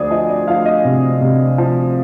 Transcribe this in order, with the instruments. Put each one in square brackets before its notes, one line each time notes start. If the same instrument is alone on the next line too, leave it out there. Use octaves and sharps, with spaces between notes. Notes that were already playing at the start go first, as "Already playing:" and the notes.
Already playing: [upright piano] D2 F3 G#4 C5 D5
F3 D#5
D5
F3 F5
D#5
C3
C3
F3